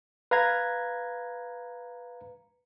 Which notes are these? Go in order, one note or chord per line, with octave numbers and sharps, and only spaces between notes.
B4 F5 A#5 G#6